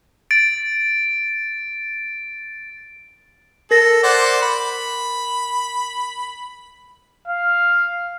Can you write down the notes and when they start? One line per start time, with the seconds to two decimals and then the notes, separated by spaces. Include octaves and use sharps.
0.31 A6 D7
3.71 A4 A#4 A#6
4.04 C5 D5 F#5
4.42 B5
7.28 F5